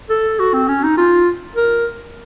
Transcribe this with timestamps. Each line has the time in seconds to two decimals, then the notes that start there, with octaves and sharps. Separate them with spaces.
0.09 A4
0.39 F#4
0.53 C4
0.68 C#4
0.83 D#4
0.97 F4
1.56 A#4